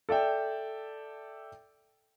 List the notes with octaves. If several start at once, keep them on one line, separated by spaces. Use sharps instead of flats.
A4 D5 E5 G5